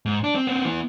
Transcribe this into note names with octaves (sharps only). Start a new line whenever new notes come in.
G#2
D4
C4
B3 C4
E3 B3